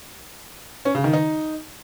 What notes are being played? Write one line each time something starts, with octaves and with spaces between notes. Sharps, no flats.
C#4
C#3
D#3
D#4